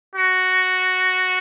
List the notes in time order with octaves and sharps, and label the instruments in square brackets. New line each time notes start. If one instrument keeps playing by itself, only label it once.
[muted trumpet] F#4